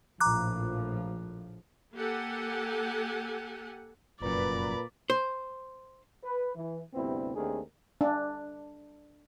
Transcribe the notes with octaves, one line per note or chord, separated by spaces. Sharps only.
A#1 A2 F3 A#5 D6 F#6
A#3 G4 A4 F#5 G#5
F1 F#2 A#2 B4 D5 A#5 B5
C5
B4
E3
D2 G2 C3 B3 C4 E4
D#2 A3 C4 D4 G#4 A#4
D4